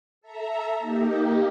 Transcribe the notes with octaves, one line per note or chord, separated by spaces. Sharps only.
A4 E5 A#5
A#3 D#4 G4